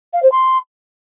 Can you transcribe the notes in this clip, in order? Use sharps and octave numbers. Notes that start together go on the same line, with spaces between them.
F5
C5
C6